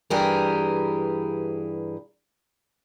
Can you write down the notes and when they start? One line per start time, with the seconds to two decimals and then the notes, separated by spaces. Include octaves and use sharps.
0.10 G2 E3 G4 G#4 A#4